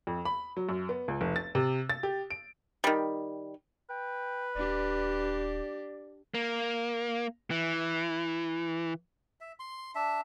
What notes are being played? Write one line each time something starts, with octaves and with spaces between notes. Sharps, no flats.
F2
B5
F#3
F#2
B3
C#2
F1
A6
C3
A6
G4
D7
D#3 G3
B4 G5
D#1 D4 G4 D5
A#3
E3
E5
C6
D4 E5